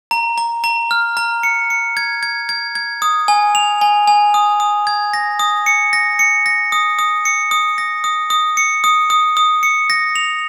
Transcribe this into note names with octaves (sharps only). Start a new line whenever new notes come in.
A#5
A#5
A#5
F6
A#5
C#7
C#7
G#6
G#6
G#6
G#6
D#6
G#5
F7
G#5
G#5
D#6
D#6
G#6
A#6
D#6
C#7
A#6
C#7
A#6
D#6
D#6
C#7
D#6
A#6
D#6
D#6
C#7
D#6
D#6
D#6
C#7
A#6
F7